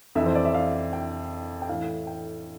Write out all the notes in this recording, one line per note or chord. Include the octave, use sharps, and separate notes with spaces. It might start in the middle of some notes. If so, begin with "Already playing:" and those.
F2 E3 E5
C5
D5
E5
F5
G5
G5
A2 E3 F5
G5